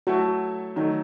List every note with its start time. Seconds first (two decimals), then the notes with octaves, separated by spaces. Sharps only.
0.07 F#3 A3 E4 F#4 A4
0.76 D#3 F#3 A3 D#4